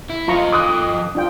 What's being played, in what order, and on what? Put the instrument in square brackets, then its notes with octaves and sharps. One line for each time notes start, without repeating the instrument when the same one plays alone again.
[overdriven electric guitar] E4
[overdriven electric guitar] F3 D#5 [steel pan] F4 A#5 C#6
[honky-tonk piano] D6 D#6 F#6
[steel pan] D4 F4 G5